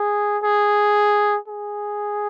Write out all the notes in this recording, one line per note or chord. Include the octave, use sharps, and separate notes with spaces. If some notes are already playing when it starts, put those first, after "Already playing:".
Already playing: G#4
G#4
G#4